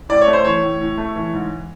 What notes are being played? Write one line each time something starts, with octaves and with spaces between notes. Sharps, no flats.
A2 D5
C#5
A3
C5
E3 C#5
A2
A2
A3
E3
G#2